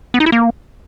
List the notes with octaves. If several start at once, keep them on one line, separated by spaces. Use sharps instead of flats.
B3
D#4
E4
A#3